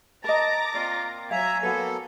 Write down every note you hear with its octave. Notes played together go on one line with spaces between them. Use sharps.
A#4 D#5 A5 A#5 D6 A#6
A#3 C4 F4 D5
F#3 E5 F5 G#5 A#5
A#3 B3 F#4 A4 B4